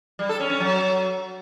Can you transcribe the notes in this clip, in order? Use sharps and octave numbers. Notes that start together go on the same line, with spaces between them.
G3
A4
C#4
C#4
F#3